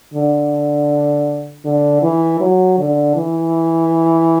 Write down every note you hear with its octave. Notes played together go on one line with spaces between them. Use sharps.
D3
D3
E3
F#3
D3
E3